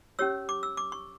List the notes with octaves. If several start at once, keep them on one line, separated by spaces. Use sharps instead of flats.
C#4 G4 C#5 E6
D6
E6
D6
C#6